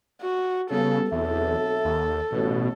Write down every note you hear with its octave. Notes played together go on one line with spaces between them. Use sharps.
F#4
C#3 G3 B3 A4
B1 E2 C4 A4 E5
D#2
A1 B2